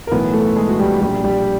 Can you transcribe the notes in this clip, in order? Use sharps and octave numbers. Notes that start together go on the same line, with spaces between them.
A#4
B1 A2 E3 B3 B4
A3 A4
G#3 G#4
F#4
G3 G4
A#1 A#2 G3 G4
G3 G4